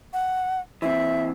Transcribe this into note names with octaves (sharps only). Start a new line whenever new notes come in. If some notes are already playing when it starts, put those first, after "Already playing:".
F#5
E3 C4 E5